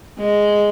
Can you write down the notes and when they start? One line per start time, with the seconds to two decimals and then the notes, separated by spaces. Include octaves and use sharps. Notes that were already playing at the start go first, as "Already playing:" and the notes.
0.19 G#3